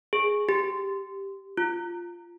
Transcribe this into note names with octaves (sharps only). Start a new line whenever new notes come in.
G#4
G4
F4